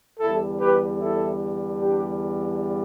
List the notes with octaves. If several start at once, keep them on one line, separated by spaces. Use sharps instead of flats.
E2 D3 G3 E4 A4
G4 B4
E4 A4
D4 G4